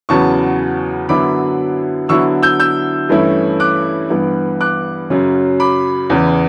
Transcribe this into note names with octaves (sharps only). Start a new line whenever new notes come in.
E2 C#3 F#3 B3 A5 C#6
F#2 D3 F#3 B3 E4 B5 D6
D3 F#3 B3 E4 C#6 E6
E6 G6
E6 G6
G2 E3 A3 C#4 E4
D6 F#6
G2 E3 B3
D6 F#6
F#2 C#3 F#3 C#4
B5 D6
E2 C#3 E3